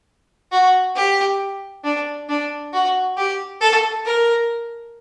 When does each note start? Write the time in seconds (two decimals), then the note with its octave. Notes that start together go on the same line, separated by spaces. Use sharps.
0.52 F#4
0.96 G4
1.84 D4
2.29 D4
2.73 F#4
3.17 G4
3.61 A4
4.05 A#4